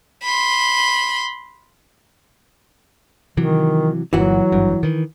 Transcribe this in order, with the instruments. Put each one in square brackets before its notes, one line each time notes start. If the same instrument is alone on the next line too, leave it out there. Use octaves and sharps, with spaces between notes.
[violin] B5 C6
[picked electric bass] C3 E3 F#3 [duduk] D#3
[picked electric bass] G1 A#2 [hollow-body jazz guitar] E3 F#4 [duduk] F#3
[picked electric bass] G#1 G2
D#3 E3